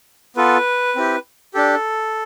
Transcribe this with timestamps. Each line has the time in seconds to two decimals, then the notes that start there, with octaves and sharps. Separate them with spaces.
0.36 B3 F4 A4 B4
0.96 C4 E4 G4
1.54 D4 G4 A4